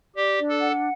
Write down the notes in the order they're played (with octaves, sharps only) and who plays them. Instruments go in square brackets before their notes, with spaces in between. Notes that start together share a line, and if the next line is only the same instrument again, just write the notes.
[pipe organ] G4 [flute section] D5
[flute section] D4
[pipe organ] A4
[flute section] F#5